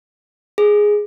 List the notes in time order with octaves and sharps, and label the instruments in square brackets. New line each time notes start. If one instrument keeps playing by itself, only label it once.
[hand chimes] G#4